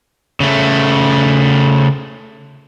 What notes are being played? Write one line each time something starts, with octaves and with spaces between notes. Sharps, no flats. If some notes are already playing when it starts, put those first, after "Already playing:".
C#3 A3